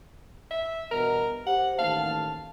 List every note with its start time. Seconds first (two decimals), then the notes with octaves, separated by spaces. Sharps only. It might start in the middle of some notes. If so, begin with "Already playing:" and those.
0.51 E5
0.91 E2 G2 B2 A#4
1.47 G4 C5 F#5
1.79 A1 D#2 F5 A5